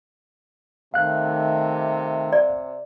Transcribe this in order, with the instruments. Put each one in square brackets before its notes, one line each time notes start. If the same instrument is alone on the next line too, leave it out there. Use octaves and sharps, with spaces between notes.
[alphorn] C3 [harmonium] D#3 A3 [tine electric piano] F5 F#6
[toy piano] D5